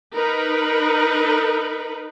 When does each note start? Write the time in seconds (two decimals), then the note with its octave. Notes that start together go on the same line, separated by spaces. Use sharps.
0.14 D#4 A#4 B4